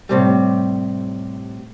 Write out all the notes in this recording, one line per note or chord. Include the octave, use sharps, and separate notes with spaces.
A2 C3 G3